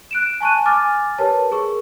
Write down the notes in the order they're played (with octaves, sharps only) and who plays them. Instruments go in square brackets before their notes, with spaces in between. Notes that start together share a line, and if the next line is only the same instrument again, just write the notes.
[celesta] F#6 D7 E7
G#5 A5 C#6 F#6 D#7
G#5 D6 F6 A6
G4 A#4 B4 C#5 A5
G#4 A#4 C#6